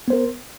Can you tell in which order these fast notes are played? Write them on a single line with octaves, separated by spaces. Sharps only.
B3 C5 A#4